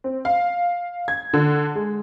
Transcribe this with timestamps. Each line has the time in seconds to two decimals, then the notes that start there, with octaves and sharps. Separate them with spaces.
0.04 C4
0.25 F5
1.08 G#6
1.34 D3
1.75 G#3